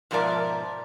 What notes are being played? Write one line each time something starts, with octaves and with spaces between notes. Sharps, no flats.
G#2 B2 F3 A#4 D5 E5